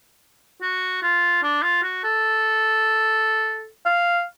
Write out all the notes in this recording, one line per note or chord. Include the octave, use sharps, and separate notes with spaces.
F#4
F4
D4
F4
F#4
A4
F5